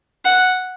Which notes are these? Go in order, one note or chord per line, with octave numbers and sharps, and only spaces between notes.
F#5